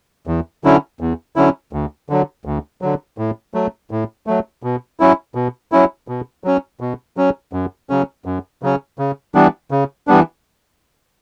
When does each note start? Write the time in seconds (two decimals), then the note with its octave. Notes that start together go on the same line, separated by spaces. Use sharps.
0.27 E2
0.64 D3 F#3 C#4 E4
1.01 E2
1.36 D3 F#3 C#4 E4
1.73 D2
2.10 D3 F#3
2.45 D2
2.82 D3 F#3
3.18 A2
3.54 F#3 A3
3.91 A2
4.27 F#3 A3
4.63 B2
5.00 F#3 C#4 E4
5.35 B2
5.72 F#3 C#4 E4
6.08 B2
6.44 F#3 C#4
6.81 B2
7.17 F#3 C#4
7.53 F#2
7.90 C#3 F#3 C#4
8.26 F#2
8.63 C#3 F#3 C#4
8.99 C#3
9.35 E3 G3 B3 D4
9.71 C#3
10.07 E3 G3 B3 D4